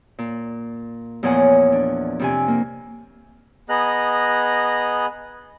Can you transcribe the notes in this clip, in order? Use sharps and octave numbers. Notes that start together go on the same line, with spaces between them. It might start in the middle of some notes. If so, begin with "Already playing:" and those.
A#2
E2 A#2 F3 C#5 F#5 G#5
D4
F2 C3 G#5
A#3
B3 G#4 D#5 A#5 F#6